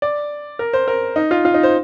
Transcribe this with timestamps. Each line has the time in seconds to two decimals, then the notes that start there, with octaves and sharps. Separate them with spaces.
0.02 D5
0.59 A#4
0.73 C5
0.88 A#4
1.16 D#4
1.31 F4
1.45 F4
1.54 D#4
1.63 C5